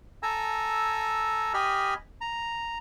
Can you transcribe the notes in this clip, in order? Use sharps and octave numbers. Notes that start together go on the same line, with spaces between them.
A4 G#5 A#5 E6
G4 D#5 G#5 B5 F6
A#5